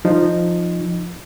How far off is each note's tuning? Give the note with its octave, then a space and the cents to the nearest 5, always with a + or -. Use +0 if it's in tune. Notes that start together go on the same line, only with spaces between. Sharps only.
F3 +0 D#4 -15